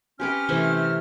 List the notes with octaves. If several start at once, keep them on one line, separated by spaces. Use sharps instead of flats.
C4 C#4 G4 B4 G5 F6
C3 E3 A3